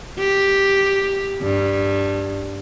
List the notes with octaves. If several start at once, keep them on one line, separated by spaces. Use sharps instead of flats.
G4
G2